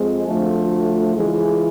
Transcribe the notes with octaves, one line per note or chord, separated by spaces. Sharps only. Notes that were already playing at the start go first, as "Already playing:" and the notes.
Already playing: F2 G#3 C4
D2 D3 F3 A3
C#2 C#3 E3 G#3